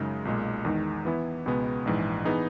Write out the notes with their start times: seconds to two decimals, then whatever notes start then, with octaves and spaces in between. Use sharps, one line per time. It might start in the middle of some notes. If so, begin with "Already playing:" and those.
Already playing: F#2 C#3 G#3 D#4
0.25 B1 A#2 G#3
0.65 E2 D#3 G#3 D#4
1.05 E3 B3 E4
1.46 C#2 B2 G#3 B3
1.85 A#1 G#2 E3
2.25 E3 B3 D#4 G#4